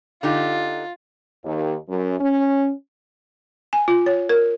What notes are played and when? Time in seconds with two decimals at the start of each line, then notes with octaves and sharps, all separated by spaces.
0.23 D3 D#4 F4 G4
1.44 D#2
1.88 F#2
2.20 C#4
3.73 G#5
3.88 F4
4.06 C#5
4.29 A#4